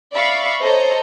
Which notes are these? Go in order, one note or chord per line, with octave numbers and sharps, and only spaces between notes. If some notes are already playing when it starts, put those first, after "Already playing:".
D5 E5 F5 B5 C#6
A4 C5 C#5 D#5 A#5